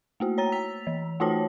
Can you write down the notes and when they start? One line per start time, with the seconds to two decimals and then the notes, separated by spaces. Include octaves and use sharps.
0.20 A3 A#3 F#4
0.38 C#5 A#5 A6
0.52 E6 B6 F7
0.87 E3
1.20 A3 D#4 F4 F#4 C#5 A5